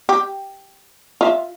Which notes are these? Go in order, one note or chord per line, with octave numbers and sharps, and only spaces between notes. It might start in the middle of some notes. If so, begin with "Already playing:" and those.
G4
F4 E5